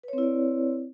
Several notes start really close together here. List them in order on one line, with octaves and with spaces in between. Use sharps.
B4 C#5 C4 E4 D5